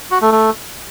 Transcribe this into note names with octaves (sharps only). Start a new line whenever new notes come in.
F#4
A3
A3